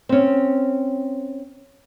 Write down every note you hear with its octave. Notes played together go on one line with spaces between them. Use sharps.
C4 C#4